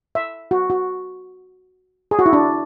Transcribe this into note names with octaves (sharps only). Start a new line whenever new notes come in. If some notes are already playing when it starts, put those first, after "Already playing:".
E5
F#4
F#4
G#4
F#4
E4
D4